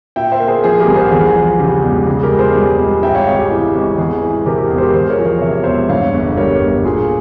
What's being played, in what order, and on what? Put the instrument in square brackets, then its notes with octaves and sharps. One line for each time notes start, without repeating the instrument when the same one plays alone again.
[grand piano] A#2 E5 G5
C5 E5
A#3
G#4 C5
F3 G#4 C5
G4 A#4
C2
G#4 C5
E2 G#4
F3
C#3 G4
E1
C#3 G#4
G4 A#4
C#2
G#4 C5
G3
C#2
G#2 E5 G5
C#5 F5
G#1 G#4
G4
E3 G4
G#1
E2 G#4
E3
C3 G4 A#4
G4
E1 G#4
C5
G4 A#4
E2 G#4 C5
A#4 C#5
F3
A#4 C#5
C3 E5
C#5
E1 C5 E5
G2 C#5 F5
G1
G3 A#4 C#5
G1
A#2 G#4